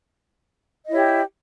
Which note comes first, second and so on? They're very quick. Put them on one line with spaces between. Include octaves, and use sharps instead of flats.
D#5 E4 C#5 G4